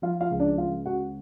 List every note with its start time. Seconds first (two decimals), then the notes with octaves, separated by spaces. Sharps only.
0.02 F3 F4 F5
0.21 F4 F5
0.30 C#2
0.40 D4 D5
0.57 C#2 F4 F5
0.86 C#3 F#4 F#5